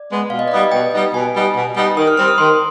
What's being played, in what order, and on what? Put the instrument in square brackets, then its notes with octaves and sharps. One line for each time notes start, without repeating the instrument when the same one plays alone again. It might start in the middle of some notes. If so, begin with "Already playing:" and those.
Already playing: [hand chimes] D5
[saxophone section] G#3 B3
[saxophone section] B2 [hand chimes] F5
[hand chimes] D#5
D5
[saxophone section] G3 B3 D#4 [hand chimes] D#5
[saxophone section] B2 [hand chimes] G5
[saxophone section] G3 B3 D#4
[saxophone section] B2 [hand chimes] G#5
[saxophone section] G3 B3 D#4
B2
G3 B3 D#4
[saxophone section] D#3 [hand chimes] D#6
[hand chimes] F6
[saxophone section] G3 C4 [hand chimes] F6
[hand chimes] D#6
[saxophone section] D#3 [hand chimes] C6